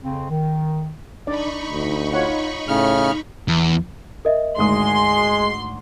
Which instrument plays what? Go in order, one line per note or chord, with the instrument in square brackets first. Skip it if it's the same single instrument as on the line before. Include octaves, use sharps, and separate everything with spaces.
[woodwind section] F2 C#3 C4
D#3
[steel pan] D4 D5 [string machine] D#4 B5 C#6
[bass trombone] D2
[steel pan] F4 C#5 F#5
[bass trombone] A2 [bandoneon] C#3 F6
[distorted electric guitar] E2
[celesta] A#4 D#5 E5
[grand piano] G#1 D2 D#6 [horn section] G#3 [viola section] C6